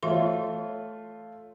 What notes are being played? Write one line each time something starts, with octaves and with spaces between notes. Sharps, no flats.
E3 A3 F4 C#5 E5 C6